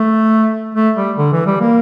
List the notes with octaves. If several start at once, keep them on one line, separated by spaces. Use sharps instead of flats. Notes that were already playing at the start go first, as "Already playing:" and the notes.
Already playing: A3
A3
G3
D3
E3
G3
A#3